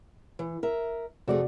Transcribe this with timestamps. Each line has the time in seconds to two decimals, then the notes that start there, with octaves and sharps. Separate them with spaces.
0.39 E3
0.63 A#4 E5
1.28 F2 C3 A3 F#4 G#4 D5